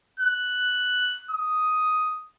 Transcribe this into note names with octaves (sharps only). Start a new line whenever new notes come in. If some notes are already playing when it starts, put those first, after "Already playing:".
F#6
D#6